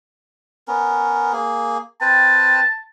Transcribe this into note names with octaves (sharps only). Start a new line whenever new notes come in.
B3 C#4 A#4
A#3 G#4
C4 B4 G5 A5